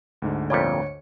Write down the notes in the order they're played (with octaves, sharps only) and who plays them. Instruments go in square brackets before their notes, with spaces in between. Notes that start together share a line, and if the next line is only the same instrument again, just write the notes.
[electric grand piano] D2 G#2 D3
[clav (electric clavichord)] F2 A#2 G3 [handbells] C#5 C#7